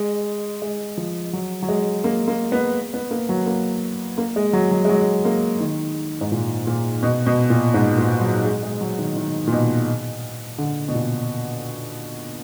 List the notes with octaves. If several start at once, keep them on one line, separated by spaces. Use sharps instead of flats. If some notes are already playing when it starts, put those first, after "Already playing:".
Already playing: G#3
G#3
F3
F#3
F#3
G#3
A#3
A#3
B3
B3
A#3
F#3
A#3
A#3
G#3
F#3
F#3
G#3
F#3
A#3
D#3
G#2
A#2
A#2
B2
B2
A#2
G#2
A#2
F#3
G#3
G#3
F#3
D#3
D#3
A#2
B2
D3
B2
A#2